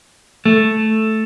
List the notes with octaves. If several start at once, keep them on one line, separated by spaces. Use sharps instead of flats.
A3